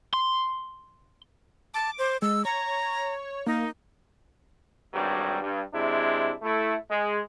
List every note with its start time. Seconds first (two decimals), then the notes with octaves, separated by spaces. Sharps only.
0.13 C6
1.74 A5 D6
1.99 C5
2.22 G#3 E6
2.45 C#5 A#5
3.46 A#3 D#4
4.93 G#1 G2 F#3 G3
5.41 G2
5.73 C3 G#3 D4 E4
6.42 A3 E4
6.89 G#3